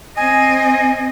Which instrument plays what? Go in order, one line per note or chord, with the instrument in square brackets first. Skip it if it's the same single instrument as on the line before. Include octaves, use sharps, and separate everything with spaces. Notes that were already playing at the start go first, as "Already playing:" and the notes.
[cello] C4 D#5 [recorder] G#5